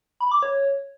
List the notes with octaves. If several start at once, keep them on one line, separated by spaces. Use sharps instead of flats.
B5
D6
C#5